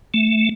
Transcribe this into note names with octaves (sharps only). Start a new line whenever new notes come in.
A3